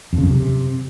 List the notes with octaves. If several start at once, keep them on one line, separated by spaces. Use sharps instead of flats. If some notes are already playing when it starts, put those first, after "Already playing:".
F2
C#3
F#2
C3